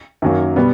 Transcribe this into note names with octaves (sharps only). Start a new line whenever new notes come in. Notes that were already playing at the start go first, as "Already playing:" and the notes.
F#2 D#3 F#3 A#3
B2 G3 B3